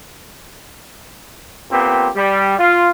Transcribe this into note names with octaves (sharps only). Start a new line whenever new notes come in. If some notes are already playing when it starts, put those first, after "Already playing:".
A#2 B3 C4 G4
G3
F4